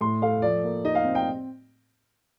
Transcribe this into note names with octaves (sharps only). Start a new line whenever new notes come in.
A2 C6
A3 F5
F3 D5
A#3
D#4 D#5
F5
C4
G5